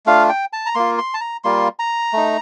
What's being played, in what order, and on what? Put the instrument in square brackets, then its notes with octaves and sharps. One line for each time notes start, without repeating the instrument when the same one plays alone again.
[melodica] A3 D4 F4 F5
G5
A5
A#5
A#3 F4 C6
C6
A5
A#5
G3 A#3 F4 C6
A#5
A3 D#4